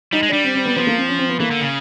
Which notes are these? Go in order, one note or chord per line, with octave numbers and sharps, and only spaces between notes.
G3 D#4
G#3
G3 D4
C4
C4
B3
F3 B3
A#3
C4
C#4
C4
B3
E3 A#3
D3
C#3